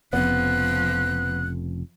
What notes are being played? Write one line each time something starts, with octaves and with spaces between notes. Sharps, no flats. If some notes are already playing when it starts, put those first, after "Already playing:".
F1 F2 C#3 F3 B3 F#6